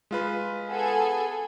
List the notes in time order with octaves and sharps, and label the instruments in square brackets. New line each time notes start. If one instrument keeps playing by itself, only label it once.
[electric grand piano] G#3 F4 B4
[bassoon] B3 [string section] G#4 A4 G#5